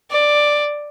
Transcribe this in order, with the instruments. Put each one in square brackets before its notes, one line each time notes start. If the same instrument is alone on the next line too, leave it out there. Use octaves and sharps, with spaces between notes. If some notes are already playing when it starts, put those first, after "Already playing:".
[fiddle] D5